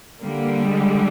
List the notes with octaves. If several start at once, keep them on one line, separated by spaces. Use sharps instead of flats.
D3 G3 A#3
G#3